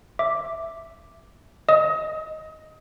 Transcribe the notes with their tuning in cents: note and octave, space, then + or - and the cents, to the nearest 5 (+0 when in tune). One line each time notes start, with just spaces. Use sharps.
E5 +0 D6 +0
D#5 +5 D#6 +35